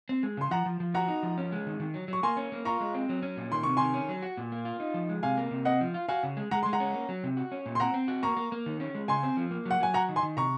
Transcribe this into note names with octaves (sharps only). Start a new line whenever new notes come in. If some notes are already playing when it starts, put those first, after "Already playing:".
C4
G#3
C#3 C6
F3 F#5 A#5
F3
F3
F#4 F#5 A#5
D#4
F3
C#4
G#3
D#3
D#3
F#3
F#3 C#6
A#3 G#5 C6
C#4
A#3
F4 A#5 C#6
G#3
C4
F#3
C#4
A#2
D#3 C6
C3 C#6
D#3 G#5 C6
C#4
F#3
F#4
A#2
A#3
F4
D#4
F3
G#3
C3 F5 G#5
A#3
C3
C4 D#5 F#5
F3
F4
F#4 F5 G#5
C#3
G#3
G#3 F#5 A#5
G#3 C6
F#5 A#5
C#4
A#3
F#3
C3
F#4
C#4
A#2
C6
C4 F#5 A#5
C4
F#4
A#3 A#5 C#6
A#3
A#3
D#3
C#4
G#3
C#3 G#5 C6
C4
F3
A#3
F#3
F#5
F#3 G#5
F#4 F#5 A#5
D#3
G#5 C6
D#3
C3 A#5 C#6